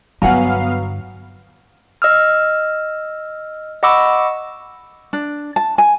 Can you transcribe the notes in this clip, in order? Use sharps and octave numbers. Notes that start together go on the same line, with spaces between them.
G2 D3 F#3 B3 F5 F#5 G#5 A#5
D#5 E6 F6
D#5 F#5 B5 C#6 D6 E6
D4
A5
G#5